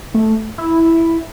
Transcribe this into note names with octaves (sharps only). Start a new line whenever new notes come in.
A3
E4